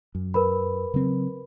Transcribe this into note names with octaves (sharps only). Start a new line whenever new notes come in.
F#2
A#4 B4 B5
C#3 F#3 C4